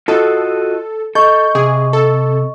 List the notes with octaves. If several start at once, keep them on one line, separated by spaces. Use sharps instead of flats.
F4 F#4 A4 D#5
A4 D#5 C#6 G6
C3 G#4
A4